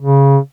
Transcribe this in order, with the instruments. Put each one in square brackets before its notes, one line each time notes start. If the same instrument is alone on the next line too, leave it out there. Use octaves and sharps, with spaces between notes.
[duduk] C#3